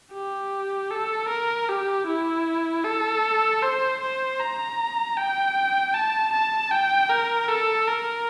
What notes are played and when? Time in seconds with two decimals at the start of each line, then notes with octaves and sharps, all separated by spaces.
0.13 G4
0.90 A4
1.29 A#4
1.69 G4
2.07 E4
2.84 A4
3.63 C5
4.01 C5
4.40 A#5
5.17 G5
5.94 A5
6.33 A5
6.71 G5
7.10 A#4
7.49 A4
7.88 A#4